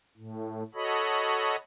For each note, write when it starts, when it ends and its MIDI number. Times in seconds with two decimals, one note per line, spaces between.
0.17 0.63 45
0.74 1.56 66
0.74 1.56 69
0.74 1.56 73
0.74 1.56 75
0.74 1.56 83